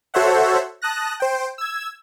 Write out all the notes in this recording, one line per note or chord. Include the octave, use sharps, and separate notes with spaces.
F#4 A4 C5 C#5 E5 F#5
A5 D#6 F#6 A#6
C5 G5
E6 G#6